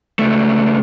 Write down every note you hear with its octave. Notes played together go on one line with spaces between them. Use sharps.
C#2 A3